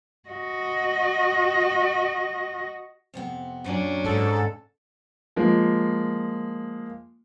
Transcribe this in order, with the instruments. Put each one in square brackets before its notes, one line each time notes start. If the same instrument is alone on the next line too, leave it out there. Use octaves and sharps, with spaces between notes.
[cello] F#4 D#5
[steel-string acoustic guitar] F2 C3 B3
[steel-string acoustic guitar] F#2 A#2 F#3 [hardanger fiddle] C#4 D4
[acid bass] G#2 [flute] A4
[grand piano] F3 G#3 A#3